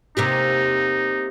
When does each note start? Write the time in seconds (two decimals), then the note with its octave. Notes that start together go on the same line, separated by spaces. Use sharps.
0.17 C3 A#3 D#4 G4